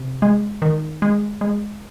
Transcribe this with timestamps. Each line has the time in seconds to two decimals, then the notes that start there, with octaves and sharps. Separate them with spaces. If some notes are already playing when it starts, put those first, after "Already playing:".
Already playing: C3
0.22 G#3
0.62 D#3
1.02 G#3
1.41 G#3